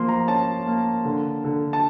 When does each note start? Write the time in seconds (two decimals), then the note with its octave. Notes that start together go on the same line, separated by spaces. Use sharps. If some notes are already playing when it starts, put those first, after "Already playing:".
Already playing: F3 A#3 C6
0.08 A#5
0.28 C#4 A5
0.67 A#3
1.05 D3
1.44 D3
1.73 A5